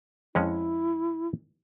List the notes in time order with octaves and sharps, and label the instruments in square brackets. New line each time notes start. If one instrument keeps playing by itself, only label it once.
[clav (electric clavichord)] F2 G#3 C#4 [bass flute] E4